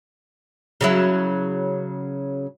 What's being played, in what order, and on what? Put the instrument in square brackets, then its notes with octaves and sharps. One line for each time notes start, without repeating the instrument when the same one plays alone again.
[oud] C#3 F#3 E4